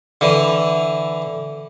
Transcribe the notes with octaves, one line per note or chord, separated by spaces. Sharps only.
D3 E3